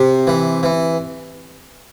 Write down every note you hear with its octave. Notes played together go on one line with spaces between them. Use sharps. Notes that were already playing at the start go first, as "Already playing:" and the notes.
Already playing: C3
E3
E3